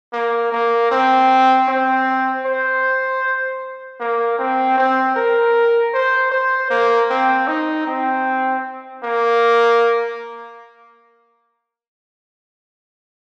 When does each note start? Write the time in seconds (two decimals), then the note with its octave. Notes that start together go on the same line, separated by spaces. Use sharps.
0.13 A#3
0.52 A#3
0.91 C4
1.68 C4
2.46 C5
4.00 A#3
4.39 C4
4.78 C4
5.16 A#4
5.94 C5
6.32 C5
6.70 A#3
7.10 C4
7.48 D#4
7.87 C4
9.03 A#3